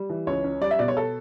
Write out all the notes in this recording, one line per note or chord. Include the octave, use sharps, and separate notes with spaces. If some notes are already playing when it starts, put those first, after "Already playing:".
Already playing: G3
E3
C#2 C#5
C#4
G3 D5
E5
B2 D5
C#5
A4